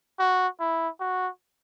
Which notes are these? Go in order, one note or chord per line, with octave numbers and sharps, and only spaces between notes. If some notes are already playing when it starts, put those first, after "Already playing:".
F#4
E4
F#4